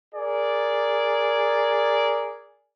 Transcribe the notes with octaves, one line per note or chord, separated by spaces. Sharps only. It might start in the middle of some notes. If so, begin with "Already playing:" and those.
G#4 A#4 D5